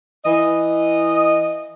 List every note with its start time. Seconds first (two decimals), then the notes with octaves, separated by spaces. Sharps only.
0.24 E3 D#5